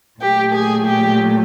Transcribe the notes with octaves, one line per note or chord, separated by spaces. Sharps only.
A#2 F#3 A3 G4
G#4
G4